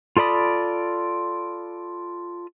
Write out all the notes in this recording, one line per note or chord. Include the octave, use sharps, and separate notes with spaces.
F4 A4 D5 B5 D#6